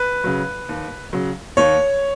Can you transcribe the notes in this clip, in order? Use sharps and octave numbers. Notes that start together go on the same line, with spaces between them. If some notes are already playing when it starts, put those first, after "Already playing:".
Already playing: B4
C#3 F#3
D#2
C#3 F#3
D#2 C#5